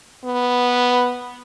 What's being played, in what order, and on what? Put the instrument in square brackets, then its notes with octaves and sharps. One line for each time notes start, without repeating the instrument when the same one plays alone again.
[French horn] B3